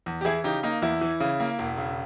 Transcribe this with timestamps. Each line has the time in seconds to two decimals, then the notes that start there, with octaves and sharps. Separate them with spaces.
0.06 E2
0.21 G4
0.25 E3 E4 G#4
0.44 C#3 D#4 G4
0.63 A#3 D#4
0.82 E2 E4
1.01 E3
1.20 C#3
1.40 A#3
1.59 E1
1.78 C#3